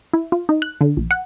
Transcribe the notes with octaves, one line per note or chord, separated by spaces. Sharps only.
E4
F4
D#4
F#6
D3
A#1
F#5